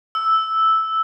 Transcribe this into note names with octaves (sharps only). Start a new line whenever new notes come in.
E6